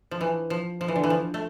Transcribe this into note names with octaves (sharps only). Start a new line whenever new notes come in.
F3
E3
F3
F3
E3
D3
E3
F3
A3